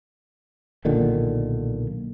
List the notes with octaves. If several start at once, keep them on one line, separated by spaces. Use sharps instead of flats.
B1 A#2 D3 D#3